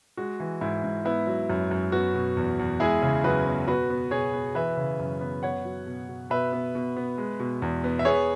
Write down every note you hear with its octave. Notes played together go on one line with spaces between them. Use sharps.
G#3 F#4
E3
G#2 E4
G#2
B3 E4
F#3
F#2
F#2
B3 F#4
B2
E2
E2
G#3 E4 G#4
C#3
F#2 F#4 B4
B3
B2 F#4 B4
B3
B2 G#4 C#5
B3
E3 B4 E5
C#3
F#2
B3
B3 C#5 F#5
F#3
B2
B2
B2 B4 E5
B3
B2
B3
G#3
B2
E2
B3
E5
B3 G#4 C#5